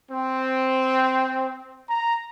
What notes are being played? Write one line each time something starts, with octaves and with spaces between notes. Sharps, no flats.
C4
A#5